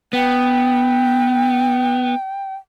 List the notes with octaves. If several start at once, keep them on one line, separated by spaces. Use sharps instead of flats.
B3 G5